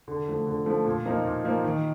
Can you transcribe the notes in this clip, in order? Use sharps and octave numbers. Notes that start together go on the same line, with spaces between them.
D3
F3 A3
D3
F3 A3
A#2
F3 A#3 D#4
A#2
F3 A#3 D#4
D#3